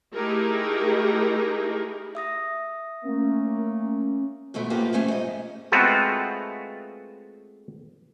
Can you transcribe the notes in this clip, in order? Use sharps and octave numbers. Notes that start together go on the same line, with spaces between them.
A3 D#4 E4 G4 G#4 A#4
E5 D#6 A#6
A3 A#3 C#4
G#2 B2 F3 A3
A2 F3 A#3 B3 G4
A3 C#4 D#4 G#4 C5
G#2 D#5
G#3 A3 B3 C4 F4 F#4